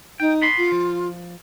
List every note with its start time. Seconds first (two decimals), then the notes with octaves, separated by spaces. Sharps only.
0.20 D#4 G5
0.42 B3 B5 C6
0.57 F4
0.72 F3